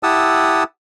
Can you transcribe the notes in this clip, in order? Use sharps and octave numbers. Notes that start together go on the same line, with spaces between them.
E4 G4 F#5 A5 D#6 E6